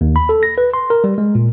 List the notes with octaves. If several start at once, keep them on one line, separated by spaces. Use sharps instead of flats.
D#2
B5
A4
A#6
B4
C6
A#4
G3
G#3
A#2